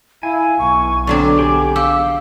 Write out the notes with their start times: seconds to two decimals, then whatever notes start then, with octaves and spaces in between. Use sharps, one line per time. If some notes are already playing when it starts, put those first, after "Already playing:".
0.23 E4 F5 G#5
0.59 B1 C#6
1.07 D3 F#3 C4 D6
1.39 G4 G#4
1.76 G4 F5 E6